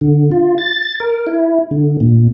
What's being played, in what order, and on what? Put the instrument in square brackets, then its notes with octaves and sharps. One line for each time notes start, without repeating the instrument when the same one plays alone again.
[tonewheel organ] D3
F4
A6
A#4
E4
D3
A#2